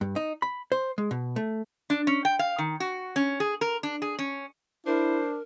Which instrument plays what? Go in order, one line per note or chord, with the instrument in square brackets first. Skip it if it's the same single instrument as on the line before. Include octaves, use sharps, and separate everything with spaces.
[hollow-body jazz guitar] G2
D#4
B5
C5
G#3
B2
A3
[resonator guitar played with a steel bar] D4
C#4
G5
F5
D#3
F#4
C#4
G#4
A#4
D4
G#4
C#4
[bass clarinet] D4 [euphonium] E4 [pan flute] A#4 [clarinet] C5